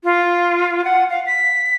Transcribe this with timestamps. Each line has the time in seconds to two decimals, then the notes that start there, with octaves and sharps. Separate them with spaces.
0.04 F4
0.85 F#5
1.10 F5
1.26 B6